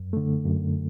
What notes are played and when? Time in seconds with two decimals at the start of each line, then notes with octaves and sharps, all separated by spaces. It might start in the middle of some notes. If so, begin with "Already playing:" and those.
Already playing: F#2
0.13 D3 A3
0.46 F#2